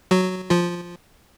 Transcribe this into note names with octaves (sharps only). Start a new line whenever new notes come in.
F#3 F#4
F3 F4